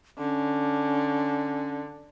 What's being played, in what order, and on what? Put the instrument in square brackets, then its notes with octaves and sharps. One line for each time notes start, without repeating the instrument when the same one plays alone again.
[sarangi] D3 [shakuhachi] C#4